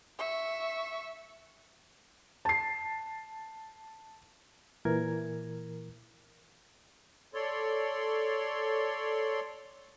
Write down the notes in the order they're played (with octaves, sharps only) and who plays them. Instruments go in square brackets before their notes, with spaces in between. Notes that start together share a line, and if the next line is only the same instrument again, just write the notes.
[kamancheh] E5 C#6
[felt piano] A5 C7
[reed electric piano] A#2 E3 A#4 G#6
[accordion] A4 C#5 D5 C6